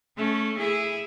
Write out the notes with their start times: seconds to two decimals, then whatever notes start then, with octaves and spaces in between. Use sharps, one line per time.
0.17 A3 C#4
0.58 E4 G#4